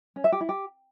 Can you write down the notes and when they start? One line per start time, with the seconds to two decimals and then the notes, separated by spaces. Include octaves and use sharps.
0.16 C#4
0.24 E5
0.32 G4
0.41 E4
0.49 G4